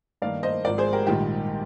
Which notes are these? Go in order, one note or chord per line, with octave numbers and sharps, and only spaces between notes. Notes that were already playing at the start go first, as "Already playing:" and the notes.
G2 D#3 A#3 D5 F5
C5 D#5
G#1 G#2 F3 A#4 D5
G#4 C5
G4 A#4
A#1 G#2 D#3 G3 G4